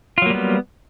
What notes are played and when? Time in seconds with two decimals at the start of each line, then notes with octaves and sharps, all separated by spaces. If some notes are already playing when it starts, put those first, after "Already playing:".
0.18 F4
0.22 F#3
0.26 A#3
0.30 G3
0.34 B3